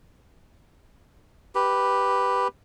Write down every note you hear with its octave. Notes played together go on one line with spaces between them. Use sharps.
G4 B4